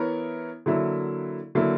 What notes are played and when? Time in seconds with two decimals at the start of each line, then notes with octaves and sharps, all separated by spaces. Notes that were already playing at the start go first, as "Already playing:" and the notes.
Already playing: E3 B3 E4 A#4 C#5
0.66 D3 F#3 A#3 E4
1.55 D3 F#3 A#3 E4